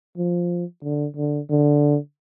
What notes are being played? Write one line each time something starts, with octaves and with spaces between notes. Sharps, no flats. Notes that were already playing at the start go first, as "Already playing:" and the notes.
F3
D3
D3
D3